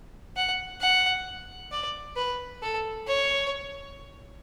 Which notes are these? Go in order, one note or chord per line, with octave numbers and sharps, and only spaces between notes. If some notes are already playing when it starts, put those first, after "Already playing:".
F#5
F#5
D5
B4
A4
C#5